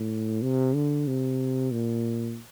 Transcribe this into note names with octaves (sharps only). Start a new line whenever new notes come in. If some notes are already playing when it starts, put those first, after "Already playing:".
Already playing: A2
C3
D3
C3
A#2